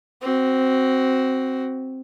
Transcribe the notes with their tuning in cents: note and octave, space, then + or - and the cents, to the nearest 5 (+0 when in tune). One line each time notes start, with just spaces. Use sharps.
C4 +0 F#4 +15